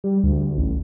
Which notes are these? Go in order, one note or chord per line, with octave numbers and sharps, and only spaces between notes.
G3
D2
A1